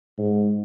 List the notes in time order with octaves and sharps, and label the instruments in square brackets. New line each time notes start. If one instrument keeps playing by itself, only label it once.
[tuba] G#2